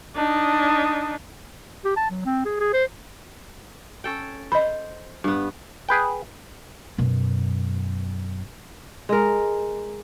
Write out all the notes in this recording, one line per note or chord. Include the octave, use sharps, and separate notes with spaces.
D4 D#4
G4
A5
F#3
C4
G#4
G#4
C5
C#4 A4 G5
C5 D#5 B5
G2 B3
G#4 B4 G5
F#2 B2
G#3 A#4